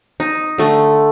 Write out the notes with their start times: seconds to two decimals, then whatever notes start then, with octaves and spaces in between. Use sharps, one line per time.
0.20 D#4
0.58 D3 A3